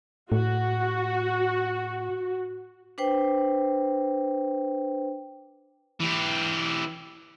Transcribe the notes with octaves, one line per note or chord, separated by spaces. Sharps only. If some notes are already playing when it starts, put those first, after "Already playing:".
A2 F#4
D4 B4 C5 G5
E3 G4